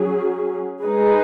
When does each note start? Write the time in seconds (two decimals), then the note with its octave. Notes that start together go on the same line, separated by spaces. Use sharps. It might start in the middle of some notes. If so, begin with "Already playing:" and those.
Already playing: F#3 C#4 G#4
0.84 G#3 D#4 G#4 B4